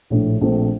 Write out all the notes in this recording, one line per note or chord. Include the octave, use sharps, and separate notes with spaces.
A#1 A2 A3 D4
A#1 A#2 A3 C4